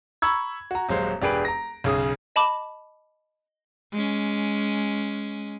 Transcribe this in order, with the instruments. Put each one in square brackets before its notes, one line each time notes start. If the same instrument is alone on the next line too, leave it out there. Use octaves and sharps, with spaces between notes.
[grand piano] A#5 B5 C#6 E6 G#6
F#4 A#5
D#1 F#3 G#3 C5 F5
E1 D4 G4 G#4 B4 D7
A#5 A#6
B1 C#3 G#4 D#6
[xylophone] D#5 A5 B5 D6
[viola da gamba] G#3 C#4